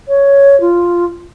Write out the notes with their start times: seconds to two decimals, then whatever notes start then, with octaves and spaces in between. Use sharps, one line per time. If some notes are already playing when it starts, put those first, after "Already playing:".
0.08 C#5
0.61 F4